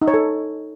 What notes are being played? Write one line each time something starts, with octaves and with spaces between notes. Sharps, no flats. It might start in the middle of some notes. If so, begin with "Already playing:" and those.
D#4
C#5
A4